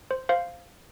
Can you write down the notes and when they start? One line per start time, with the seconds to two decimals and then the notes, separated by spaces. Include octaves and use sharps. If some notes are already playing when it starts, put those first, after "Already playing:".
0.11 C5
0.29 C5 F5